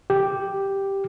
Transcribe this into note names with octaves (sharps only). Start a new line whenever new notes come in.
G4